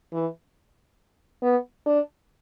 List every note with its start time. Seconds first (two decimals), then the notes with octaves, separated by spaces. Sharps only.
0.13 E3
1.42 B3
1.86 D4